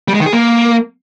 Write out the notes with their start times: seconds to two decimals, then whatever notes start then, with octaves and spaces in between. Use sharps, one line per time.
0.08 G3
0.14 G#3
0.20 D#3
0.26 G#4
0.32 A#3